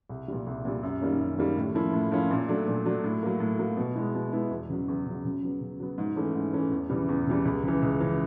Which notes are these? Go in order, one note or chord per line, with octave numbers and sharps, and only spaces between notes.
C2
A#2 G3
C2
A#2 G3
F#2
D#3 G3 A#3 C#4
F#2
D#3 G3 A#3 C#4
A2
F3 A#3 C#4 E4
A2
F3 A#3 C#4 E4
A#2
F#3 A3 D4
A#2
F#3 A3 D4
A2
F#3 A#3
A2
F#3 A#3
B2
G#3 B3 E4
B2
G#3 B3 E4
E2
C#3 F#3
E2
C#3 F#3
C#3
F#3 B3
C#3
F#3 B3
G#2
E3 A3 C#4
G#2
E3 A3 C#4
E2
C#3 E3 G3
E2
C#3 E3 G3
C#2
C#3 E3
C#2
C#3 E3